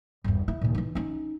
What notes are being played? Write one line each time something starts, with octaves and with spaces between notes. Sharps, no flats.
G1 E2
E4
D#2 A#2
E3 D#4
C#4 D#4